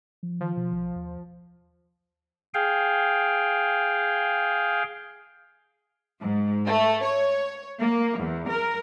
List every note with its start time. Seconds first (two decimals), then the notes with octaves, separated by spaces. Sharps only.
0.23 F3
0.40 D#3 F3
0.57 B2
0.73 B1
0.96 D#2
2.54 G#4 F5 G5
6.20 G#2
6.65 A3
7.03 C#5
7.78 A#3
8.18 E2
8.48 A#4